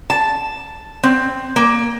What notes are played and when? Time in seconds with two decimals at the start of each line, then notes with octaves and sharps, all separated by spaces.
0.10 A5
1.03 C4
1.56 A#3